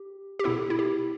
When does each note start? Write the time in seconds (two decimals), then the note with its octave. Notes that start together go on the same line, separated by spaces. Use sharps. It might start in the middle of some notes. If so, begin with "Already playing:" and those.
Already playing: G4
0.39 G4
0.44 B2 B3 E4 A4
0.70 E4
0.79 G4